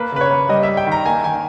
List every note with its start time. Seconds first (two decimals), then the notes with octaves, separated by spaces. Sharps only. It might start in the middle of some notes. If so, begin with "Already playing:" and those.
Already playing: A#3 B4
0.12 C#3 B4
0.21 C#5
0.31 A#3
0.49 G3 D#5
0.63 G3 E5
0.77 G5
0.86 D#3
0.92 A#5
1.05 A#3 G#5
1.23 D#3 G#5